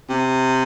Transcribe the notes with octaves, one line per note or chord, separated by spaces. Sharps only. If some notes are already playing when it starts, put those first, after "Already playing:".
C3